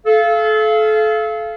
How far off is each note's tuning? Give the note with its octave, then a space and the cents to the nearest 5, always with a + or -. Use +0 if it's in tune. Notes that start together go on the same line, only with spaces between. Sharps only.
A4 -30 F5 -30